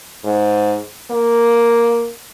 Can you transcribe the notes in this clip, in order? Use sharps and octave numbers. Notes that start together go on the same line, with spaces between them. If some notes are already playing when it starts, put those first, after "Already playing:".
G#2
A#3